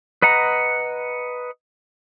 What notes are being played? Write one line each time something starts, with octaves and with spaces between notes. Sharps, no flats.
B4 D#5 F#5 A#5